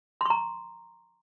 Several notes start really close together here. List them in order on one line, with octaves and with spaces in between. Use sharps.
C6 C#6 A#5